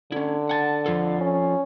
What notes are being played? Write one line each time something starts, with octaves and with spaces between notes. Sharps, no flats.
D3 C#4 E4
F#5 G#5 A5
F3 F4 A4
C#4